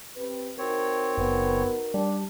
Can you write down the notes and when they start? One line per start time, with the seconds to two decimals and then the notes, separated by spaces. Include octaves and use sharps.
0.17 C4 G4 B4
0.58 C4 D#4 F#4 A#4 C#5
1.17 F#1 B3
1.94 G3 D4